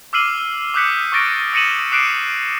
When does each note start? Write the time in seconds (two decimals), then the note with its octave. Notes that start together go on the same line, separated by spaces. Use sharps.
0.13 D6 E6 F6 C7 D#7 F#7
0.74 D6 D#6 F#6 G6 B6 C#7
1.12 C#6 D6 F6 A6 A#6 D7
1.53 D#6 A#6 C#7 D#7 E7 F#7
1.92 D6 D#6 F#6 C7 D7 E7